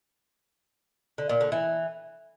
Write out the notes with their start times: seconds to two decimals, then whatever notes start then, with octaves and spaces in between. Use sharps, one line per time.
1.18 D3
1.29 A#2
1.41 D3
1.52 E3